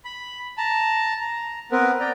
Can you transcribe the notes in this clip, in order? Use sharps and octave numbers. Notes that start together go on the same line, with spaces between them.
B5
A5 A#5
A#5
B3 C4 A#4 B4
D5 G5 A#5